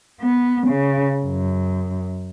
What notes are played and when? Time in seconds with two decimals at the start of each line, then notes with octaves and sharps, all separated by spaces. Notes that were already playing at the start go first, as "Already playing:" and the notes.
0.21 B3
0.68 C#3
1.24 F#2